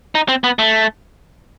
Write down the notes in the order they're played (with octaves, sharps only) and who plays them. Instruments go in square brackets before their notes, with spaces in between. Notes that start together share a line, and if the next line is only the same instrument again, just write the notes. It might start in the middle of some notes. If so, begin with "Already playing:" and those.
[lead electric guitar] D#4
C4
B3
A3